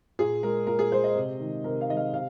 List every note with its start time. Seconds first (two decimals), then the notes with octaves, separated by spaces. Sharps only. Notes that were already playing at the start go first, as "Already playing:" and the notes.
0.19 A#2 G#4
0.43 G#3 A#4
0.67 A#2 A#4
0.79 G#4
0.92 G#3 C5
1.04 D#5
1.15 C3
1.40 D#3 G#3
1.64 C3 A#4
1.81 F5
1.89 D#3 D#5
1.93 G#3 F5
2.13 C3 F5